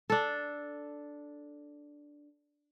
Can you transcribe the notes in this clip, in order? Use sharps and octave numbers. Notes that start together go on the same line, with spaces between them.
D4 A4